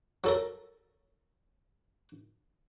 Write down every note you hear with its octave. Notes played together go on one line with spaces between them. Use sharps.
F#3 A4 A#4